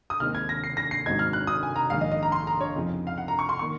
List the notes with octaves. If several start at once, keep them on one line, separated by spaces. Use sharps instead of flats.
D#6
D#2 D#3 G#3 C4 D#4 F6
G#6
A#6
C7
A#6
C7
G#1 G#2 F#3 C4 D#4 G#6
F6
F#6
D#6
G#5
A#5
A#1 G#2 D#3 F5
D#5
D#5
A#5
C6
A#5
C#5
F2 C#3 F3 C4 D#4
F5
F#5
A#5
C#6
C6
D#3 A#3 C#6